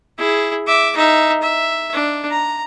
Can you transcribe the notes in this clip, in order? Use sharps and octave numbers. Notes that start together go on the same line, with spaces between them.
E4 G#4
E5 D6
D#4 E5
E5
D4
A#5